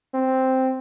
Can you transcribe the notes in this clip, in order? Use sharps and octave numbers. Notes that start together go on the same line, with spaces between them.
C4